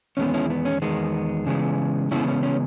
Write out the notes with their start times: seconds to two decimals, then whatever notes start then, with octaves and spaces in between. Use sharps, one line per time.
0.17 E2 D#3 G#3 B3 C#4
0.34 C#4 E4
0.50 B3
0.65 C#4
0.82 E2 D#3 G#3 B3
1.46 C#3 E3 G#3 B3
2.11 C#3 E3 G#3 B3 C#4 E4
2.28 C#4
2.43 C#4